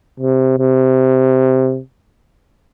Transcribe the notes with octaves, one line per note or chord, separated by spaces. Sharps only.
C3
C3